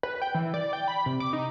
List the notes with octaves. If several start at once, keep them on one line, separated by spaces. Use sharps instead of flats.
B4
G5
E3
D5
G5
B5
C3
D6
D#4